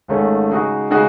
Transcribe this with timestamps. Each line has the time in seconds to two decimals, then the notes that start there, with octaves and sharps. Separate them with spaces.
0.08 G#1 G#2 D#3 A3 C#4
0.50 C#3 G#3 D#4 F#4
0.90 C#3 G#3 D#4 F#4